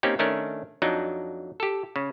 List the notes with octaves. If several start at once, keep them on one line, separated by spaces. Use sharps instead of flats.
A#3 C4 C#4 D#4 G4
D#3 A3 C#4 D4 A#4
F2 F#3 D4 D#4
G4 A4
C#3